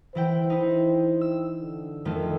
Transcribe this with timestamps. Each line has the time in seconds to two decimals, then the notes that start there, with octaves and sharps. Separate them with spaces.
0.15 E3 E4 C5 G5
0.50 D#4 E4
1.21 E6
1.60 D3
2.05 F2 D#3 A3